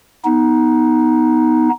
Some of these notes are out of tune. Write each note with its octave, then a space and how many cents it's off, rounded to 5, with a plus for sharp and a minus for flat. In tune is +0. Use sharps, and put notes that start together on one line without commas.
B3 +0 D#4 +15